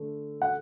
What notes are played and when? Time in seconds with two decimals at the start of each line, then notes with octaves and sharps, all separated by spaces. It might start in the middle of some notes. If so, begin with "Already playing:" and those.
Already playing: D3 A3
0.42 F#5